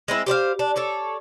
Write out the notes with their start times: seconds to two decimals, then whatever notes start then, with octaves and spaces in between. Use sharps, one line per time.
0.08 G#3 C4 E4
0.26 G4 C5 D5 F5
0.59 D4
0.76 A4 C#5 D5